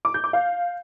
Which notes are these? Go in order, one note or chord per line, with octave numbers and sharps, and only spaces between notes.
D6
G6
D6
F5